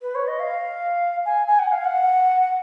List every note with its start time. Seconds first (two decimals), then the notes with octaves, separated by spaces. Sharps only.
0.02 B4
0.15 C#5
0.27 D#5
0.40 F5
1.25 G#5
1.47 G#5
1.59 F#5
1.72 F5
1.85 F#5